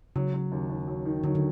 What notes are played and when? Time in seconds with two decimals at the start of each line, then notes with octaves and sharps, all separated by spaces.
0.16 C#3 F#3
0.33 F#3
0.52 D#2
0.70 D#2
0.87 F#3
1.05 D#3
1.24 D3 F#3
1.35 D3